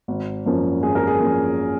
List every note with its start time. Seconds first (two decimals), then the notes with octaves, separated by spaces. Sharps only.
0.08 G#1
0.46 F#2 F3 A#3 C#4
0.83 G#1 G#4
0.95 A#4
1.07 G#4
1.20 F#2 F3 A#3 C#4